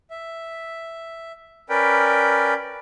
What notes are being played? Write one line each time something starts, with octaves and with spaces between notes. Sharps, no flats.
E5
C#4 A#4 B4 D5 G5